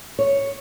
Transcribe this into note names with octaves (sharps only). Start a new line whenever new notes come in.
C#5